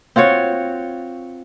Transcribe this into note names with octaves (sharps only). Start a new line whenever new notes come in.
C4 F4 F#4 C#5